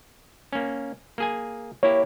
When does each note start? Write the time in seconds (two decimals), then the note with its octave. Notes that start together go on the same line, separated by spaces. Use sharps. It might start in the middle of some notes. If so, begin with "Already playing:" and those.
0.53 A#3 C#4
1.18 A#3 G#4 G#5
1.83 A#3 E4 G4 C#5